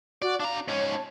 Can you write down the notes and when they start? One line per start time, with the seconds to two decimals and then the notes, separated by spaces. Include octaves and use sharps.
0.22 F#4 D5
0.40 D4 F5 A#5
0.68 G#2 C#4 C#5
0.91 A5